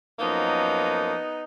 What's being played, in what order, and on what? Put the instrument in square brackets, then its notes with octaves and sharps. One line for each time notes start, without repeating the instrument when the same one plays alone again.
[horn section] F#2 F3 A#3 B3 D#4